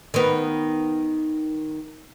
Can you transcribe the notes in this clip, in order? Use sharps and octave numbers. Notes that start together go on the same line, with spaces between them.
D#3 B3